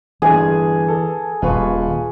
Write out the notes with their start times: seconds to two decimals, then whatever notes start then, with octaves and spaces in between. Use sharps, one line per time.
0.22 G1 E3 D4 G#4
0.88 A4
1.42 D#1 F4 B4 C#6